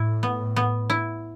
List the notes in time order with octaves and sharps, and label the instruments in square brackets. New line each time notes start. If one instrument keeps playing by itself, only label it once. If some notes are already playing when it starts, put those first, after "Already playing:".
Already playing: [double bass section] A2 [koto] E4
[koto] B3
B3
E4